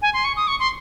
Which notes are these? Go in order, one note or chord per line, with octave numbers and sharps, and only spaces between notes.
G#5
C6
C#6
D#6
C#6
C6